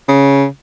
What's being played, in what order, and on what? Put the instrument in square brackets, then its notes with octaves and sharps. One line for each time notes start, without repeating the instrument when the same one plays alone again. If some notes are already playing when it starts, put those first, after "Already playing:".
[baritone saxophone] C#3